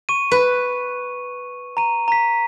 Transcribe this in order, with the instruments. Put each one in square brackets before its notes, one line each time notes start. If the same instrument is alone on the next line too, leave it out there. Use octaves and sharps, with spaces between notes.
[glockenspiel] C#6 D#7
[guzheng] B4
[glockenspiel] A#5 D#7
A#5 B6